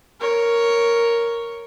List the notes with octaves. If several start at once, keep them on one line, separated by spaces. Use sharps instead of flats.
A#4 C#5